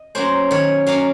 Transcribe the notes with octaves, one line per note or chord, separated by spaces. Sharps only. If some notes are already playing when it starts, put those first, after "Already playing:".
Already playing: D#5
F#3 A#3 C#4 C5
D#3 C#5
F#3 A#3 C#4 F5